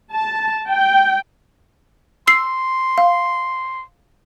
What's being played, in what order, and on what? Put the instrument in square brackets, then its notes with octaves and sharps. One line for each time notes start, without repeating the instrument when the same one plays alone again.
[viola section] A5
G5
[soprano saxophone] C6 [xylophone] E6 C7
[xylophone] F5